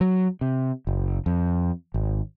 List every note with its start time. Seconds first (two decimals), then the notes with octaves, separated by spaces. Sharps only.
0.01 F#3
0.41 C3
0.87 F#1
1.26 F2
1.94 G#1